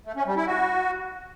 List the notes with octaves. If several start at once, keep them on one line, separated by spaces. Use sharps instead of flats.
A3
C#4
G3
E4
F#4